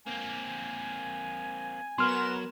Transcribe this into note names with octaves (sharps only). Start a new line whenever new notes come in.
A#3 C4 G#5
F#3 B3 A#4 C6 F6 E7